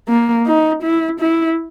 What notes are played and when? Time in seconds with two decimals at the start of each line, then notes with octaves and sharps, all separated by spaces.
0.09 A#3
0.47 D#4
0.83 E4
1.20 E4